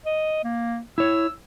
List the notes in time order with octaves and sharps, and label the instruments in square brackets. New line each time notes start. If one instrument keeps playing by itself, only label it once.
[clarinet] D#5
A#3
[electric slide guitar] E4 C#5 [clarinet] E6